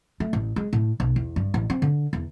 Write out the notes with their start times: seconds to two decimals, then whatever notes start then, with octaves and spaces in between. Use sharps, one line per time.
0.20 A3
0.33 A1
0.56 G#3
0.73 A2
1.00 B1
1.16 E2
1.36 G2
1.54 A1
1.70 C4
1.82 D3
2.13 E2